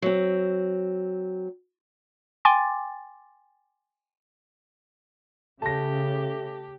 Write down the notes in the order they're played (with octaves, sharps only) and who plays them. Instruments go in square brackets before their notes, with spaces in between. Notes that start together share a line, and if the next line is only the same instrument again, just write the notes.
[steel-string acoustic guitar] F#3 C4
[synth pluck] G5 G#5 C6 D6 A6
[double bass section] C#3 [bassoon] A3 [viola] G4 [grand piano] A5 A#6